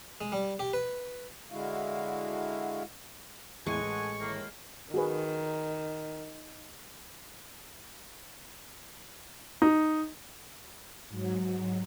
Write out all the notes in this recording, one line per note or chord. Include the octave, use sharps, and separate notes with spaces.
G#3
G3
G4
B4
D3 G#3 E4 F#4 F5
E2 A2 G#3 A4 F#5 G#5 C#6
A1
A2 D#3 A#3
D#3 F#4 G#4 B4
D#4
G#2 F#3